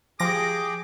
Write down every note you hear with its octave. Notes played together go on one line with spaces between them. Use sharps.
F3 G4 G#4 G5 D6 A#6